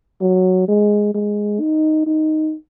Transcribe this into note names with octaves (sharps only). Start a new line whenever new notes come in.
F#3
G#3
G#3
D#4
D#4